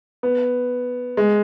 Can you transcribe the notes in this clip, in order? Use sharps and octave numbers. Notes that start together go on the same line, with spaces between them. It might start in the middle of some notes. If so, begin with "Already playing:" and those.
B3
G#3